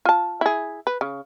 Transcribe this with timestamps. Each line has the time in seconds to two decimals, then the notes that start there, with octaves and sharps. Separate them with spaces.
0.05 F4 A5
0.41 E4 G#4
0.87 B4
1.01 C#3